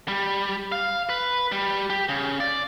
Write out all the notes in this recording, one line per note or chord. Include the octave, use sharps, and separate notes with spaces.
G3
F5
B4
G3
G4
C#3
D5